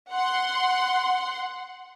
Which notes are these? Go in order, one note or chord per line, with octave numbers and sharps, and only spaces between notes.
F#5 C6